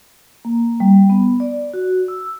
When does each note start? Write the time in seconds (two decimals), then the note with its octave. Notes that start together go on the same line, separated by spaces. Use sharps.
0.45 A#3
0.80 G3
1.10 B3
1.40 D5
1.74 F#4
2.08 E6